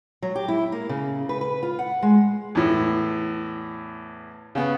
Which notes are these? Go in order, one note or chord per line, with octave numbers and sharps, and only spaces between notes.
F#3
G4
E4
A#3
C#3
B4
B4
F4
F#5
G#3
E2 A2
C#3 B3